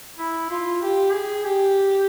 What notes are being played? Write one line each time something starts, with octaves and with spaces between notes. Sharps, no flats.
E4
F4
G4
G#4
G4